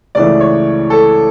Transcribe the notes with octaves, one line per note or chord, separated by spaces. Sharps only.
C#2 C#3 E3 A3 D5
C#5
A4